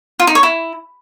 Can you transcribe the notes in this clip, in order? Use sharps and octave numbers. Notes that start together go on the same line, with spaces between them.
F4
D#4
C#5
E4